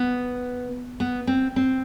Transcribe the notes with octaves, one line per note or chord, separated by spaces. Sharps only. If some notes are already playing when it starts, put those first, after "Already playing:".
Already playing: B3
B3
C4
C4